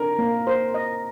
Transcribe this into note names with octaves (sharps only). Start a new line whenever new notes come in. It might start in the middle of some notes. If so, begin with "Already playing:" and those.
Already playing: D4 A#4
A#3
C5
D#5